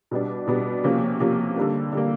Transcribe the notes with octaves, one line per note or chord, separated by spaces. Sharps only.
B2 G3 B3 D4
B2 G3 B3 D4
C3 F3 A#3 C#4
C3 F3 A#3 C#4
D3 G3 A#3
D3 G3 A#3